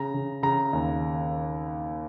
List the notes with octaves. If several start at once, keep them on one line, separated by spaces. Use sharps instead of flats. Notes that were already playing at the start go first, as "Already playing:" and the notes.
Already playing: C#3 A#5
C#3
C#3 A#5
D#2